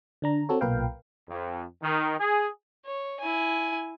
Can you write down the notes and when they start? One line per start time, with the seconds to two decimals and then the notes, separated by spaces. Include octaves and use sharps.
0.22 D3 D4 A#5
0.49 C4 F#4 A4 C#5
0.61 B1 A#2 A#4 B4 F5 G5
1.29 F2
1.83 D#3
2.19 G#4
2.85 C#5
3.20 E4 G#5